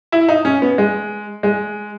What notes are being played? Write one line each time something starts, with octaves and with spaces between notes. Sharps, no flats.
E4
D#4
C#4
B3
G#3
G#3